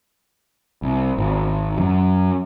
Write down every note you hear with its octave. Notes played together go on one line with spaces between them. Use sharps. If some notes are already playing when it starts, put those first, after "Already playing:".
C2
G#1
F#2